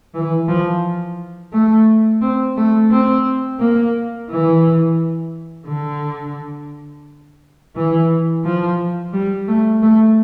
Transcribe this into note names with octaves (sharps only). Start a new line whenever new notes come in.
E3
F3
A3
C4
A3
C4
A#3
E3
D3
E3
F3
G3
A3
A3